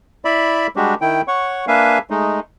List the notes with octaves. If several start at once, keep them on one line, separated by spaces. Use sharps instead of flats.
E4 D5 E5 B5
G3 G#3 D4 F#4 G4
D#3 E4 G5
C#5 F#5 C#6
A#3 D4 B4 E5 F5 G#5
G#3 A3 D#4